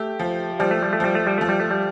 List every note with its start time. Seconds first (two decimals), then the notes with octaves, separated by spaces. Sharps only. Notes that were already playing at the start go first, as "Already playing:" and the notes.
Already playing: A3 G4
0.19 F3
0.59 F3 G3
0.71 A3
0.83 G3
0.93 A3
1.00 F3 G3
1.15 A3
1.27 G3
1.38 F3 A3
1.49 G3
1.60 A3
1.71 G3